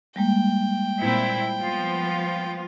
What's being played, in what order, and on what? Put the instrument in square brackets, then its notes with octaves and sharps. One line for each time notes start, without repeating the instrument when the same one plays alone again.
[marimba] G3 G#3 A#3 [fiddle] G5
[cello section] A#2 C4 E4
F3 B3 F4